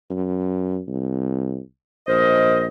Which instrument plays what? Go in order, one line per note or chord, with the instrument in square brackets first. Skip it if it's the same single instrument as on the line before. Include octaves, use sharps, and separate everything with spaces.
[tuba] F#2
C2
[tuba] A#1 [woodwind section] A#4 C5 D#5